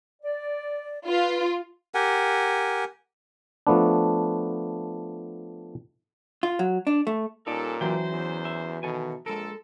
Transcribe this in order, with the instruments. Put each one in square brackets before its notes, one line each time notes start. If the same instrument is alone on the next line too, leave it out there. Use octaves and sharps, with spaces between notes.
[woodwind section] D5
[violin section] F4 [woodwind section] B4
[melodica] G4 A#4 F#5 G#5
[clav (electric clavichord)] F3 A3 B3 D4
[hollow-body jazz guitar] F4
F#3
D4
A3
[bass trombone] A#2 [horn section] G3 C#4 A4 [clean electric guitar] D#4 D5
[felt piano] E3 F#3 [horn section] C#4 C5 [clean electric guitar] G5
[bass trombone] E2
[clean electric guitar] E5
[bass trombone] B2 [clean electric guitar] D#3 A4 G#5
[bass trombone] A#1 [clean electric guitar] G#3 A#4 [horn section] A4